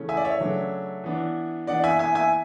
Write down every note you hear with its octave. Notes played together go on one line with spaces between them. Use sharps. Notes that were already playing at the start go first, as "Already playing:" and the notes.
Already playing: C#3 E3 A3 C#4
E5 G#5
D5
C#5 E5
C#3 F#3 A3 D4
E3 B3 D4
E3 B3 D4 D5 F#5
E5 G#5
E5 G#5
E5 G#5